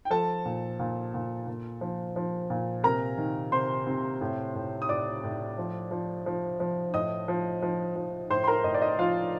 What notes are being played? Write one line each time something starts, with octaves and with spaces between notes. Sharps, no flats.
G5
F3 A4 A5
A#2
A#2
A#2
A#2
F3
F3
A#2
C3 A#4 A#5
D#3
C3 C5 C6
C3
A2
A2
D#6
A2 D5 D6
A2
F3
F3
F3
F3
A2 D#5 D#6
F3
F3
F3
A2 C5 C6
C6
A#4 A#5
A2 D#5
D5
D#5
F3 F4 F5